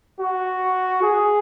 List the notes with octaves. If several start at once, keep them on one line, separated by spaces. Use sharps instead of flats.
F#4
G#4